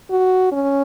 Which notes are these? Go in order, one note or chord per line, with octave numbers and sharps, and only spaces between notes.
F#4
C#4